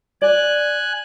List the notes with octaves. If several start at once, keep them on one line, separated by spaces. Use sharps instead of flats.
D5 G#5 F#6